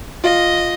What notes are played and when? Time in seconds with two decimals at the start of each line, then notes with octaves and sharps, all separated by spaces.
0.23 F4 D#5